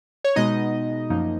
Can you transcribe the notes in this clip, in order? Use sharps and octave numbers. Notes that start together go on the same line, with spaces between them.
C#5
B2 G#3 B3 D#4 D#5
F#2 F3 A#3 D#4